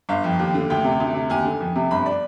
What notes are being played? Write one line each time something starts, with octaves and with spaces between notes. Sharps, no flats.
G1 F5
F2
D#2
D3
D2 G5
C3
D2
C3
D#2 G#5
D3
F2
C3
G1 B5
D5